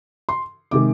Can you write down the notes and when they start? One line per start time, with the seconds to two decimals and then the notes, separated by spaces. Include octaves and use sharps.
0.29 C6
0.71 C3 D#3 G#3 D6